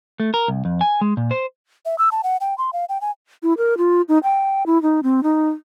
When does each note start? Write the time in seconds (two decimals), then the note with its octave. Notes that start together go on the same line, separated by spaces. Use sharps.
0.20 A3
0.34 A#4
0.48 C2
0.65 F2
0.81 G#5
1.01 G#3
1.17 A#2
1.31 C5
1.85 E5
1.98 E6
2.12 A5
2.24 F#5
2.41 G5
2.58 C6
2.73 F5
2.89 G5
3.01 G#5
3.43 E4
3.57 A#4
3.78 F4
4.09 D#4
4.23 G5
4.66 E4
4.82 D#4
5.03 C4
5.23 D#4